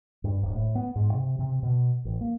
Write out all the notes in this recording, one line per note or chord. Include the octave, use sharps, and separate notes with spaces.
G2
D1
A2
B3
G#2
C3
C3
B2
A1
A#3